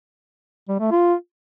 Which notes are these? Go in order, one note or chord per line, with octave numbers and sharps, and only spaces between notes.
G3
A3
F4